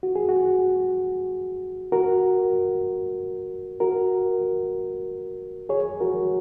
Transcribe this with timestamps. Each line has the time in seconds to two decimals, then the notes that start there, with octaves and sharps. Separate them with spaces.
0.03 F#4
0.16 G#4
0.29 F#4
1.92 F#4 A#4
3.80 F#4 A#4
5.69 G#4 C#5
6.00 F#4 A#4